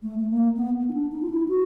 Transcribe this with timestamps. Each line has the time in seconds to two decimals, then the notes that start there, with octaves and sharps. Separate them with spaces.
0.03 A3
0.19 A3
0.30 A#3
0.57 B3
0.89 D#4
0.93 D4
1.12 D#4
1.22 F4
1.30 E4
1.48 F#4